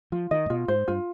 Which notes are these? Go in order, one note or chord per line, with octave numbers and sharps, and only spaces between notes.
F3 F4
D#3 D#5
G#2
B2 F4
G#2 C5
G2 F4